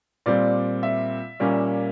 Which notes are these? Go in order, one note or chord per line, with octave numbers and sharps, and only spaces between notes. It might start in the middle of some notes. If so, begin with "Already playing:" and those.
A#2 G3 C4 D5
E5
A#2 G3 A#3 C#4